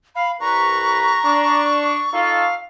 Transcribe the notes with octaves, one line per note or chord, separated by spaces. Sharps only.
F5 B5
C2 B4 A#5 C#6
D4
D#4 F4 A4 F5